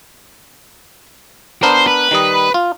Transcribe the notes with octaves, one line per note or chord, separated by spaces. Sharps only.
B3 D4 A#4 C5
B4
D#3 G3 D#5
F4